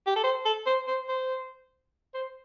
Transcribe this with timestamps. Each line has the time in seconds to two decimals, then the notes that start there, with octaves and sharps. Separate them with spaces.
0.07 G4
0.16 A4
0.24 C5
0.45 A4
0.66 C5
0.88 C5
1.09 C5
2.14 C5